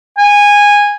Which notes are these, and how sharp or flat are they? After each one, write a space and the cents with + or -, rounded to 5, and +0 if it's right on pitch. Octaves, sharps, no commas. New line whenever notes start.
G#5 -15